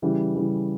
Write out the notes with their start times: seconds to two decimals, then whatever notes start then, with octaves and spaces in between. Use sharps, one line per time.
0.02 C#3 E3 G3
0.35 C#3 E3 G3